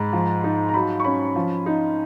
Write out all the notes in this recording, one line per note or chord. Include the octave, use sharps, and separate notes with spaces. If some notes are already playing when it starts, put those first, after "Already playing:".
Already playing: G#2 B5
F3
D#4
A#5
F#3 B5
C#6
C#4 B5
F3
D#4